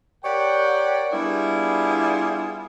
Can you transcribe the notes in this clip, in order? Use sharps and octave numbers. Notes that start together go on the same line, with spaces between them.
G4 A#4 C#5 D5 F#5 G5
G3 B3 D4 E4 F4 G#4